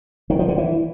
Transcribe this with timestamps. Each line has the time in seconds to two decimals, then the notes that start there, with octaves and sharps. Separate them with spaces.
0.30 D#3
0.39 F3
0.48 D3
0.58 E3